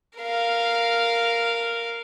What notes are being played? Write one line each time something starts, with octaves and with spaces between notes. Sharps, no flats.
A#4 F5